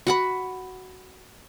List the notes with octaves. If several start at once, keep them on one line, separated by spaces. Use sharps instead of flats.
F#4 F#5 B5